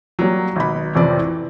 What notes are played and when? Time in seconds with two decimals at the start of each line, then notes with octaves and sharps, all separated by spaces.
0.19 F#3 G3 A#3
0.56 G#1 B2 B5
0.95 A1 F2 C3 C4 D5
1.19 E3